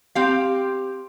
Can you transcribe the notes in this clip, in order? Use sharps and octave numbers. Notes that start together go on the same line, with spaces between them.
C4 G4 F5